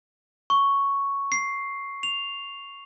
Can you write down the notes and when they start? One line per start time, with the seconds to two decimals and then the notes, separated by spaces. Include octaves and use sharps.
0.50 C#6
1.32 C7
2.03 F7